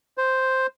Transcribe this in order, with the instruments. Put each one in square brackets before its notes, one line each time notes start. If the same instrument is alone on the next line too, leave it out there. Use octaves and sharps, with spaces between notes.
[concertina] C5